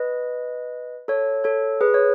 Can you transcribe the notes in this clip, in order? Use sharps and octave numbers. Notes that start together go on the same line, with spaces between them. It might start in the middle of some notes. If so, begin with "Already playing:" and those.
Already playing: B4 D#5
A4 C#5
A4 C#5
G#4 B4
C#5